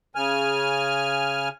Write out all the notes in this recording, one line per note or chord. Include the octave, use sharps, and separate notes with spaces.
C#3 G#5 F6